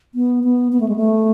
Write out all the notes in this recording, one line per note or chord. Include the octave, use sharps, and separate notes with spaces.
B3
B3
B3
A3
G#3
A3